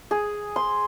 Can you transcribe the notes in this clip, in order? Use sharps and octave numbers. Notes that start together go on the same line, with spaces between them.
G#4
C6